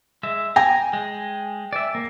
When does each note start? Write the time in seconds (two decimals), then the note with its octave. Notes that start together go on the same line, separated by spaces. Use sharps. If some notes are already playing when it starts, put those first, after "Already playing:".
0.23 G#3 E5
0.56 G5 G#5 A#5
0.93 G#3
1.73 D5 E5
1.95 A#3